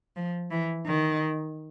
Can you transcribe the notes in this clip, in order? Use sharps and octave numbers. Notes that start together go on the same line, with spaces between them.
F3
E3
D#3